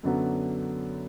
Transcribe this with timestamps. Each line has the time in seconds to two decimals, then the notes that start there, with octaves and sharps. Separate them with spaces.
0.03 F#2 D3 F#3 B3 F#4